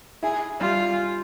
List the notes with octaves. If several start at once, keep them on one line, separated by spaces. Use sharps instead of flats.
E4 G#4
G3 F4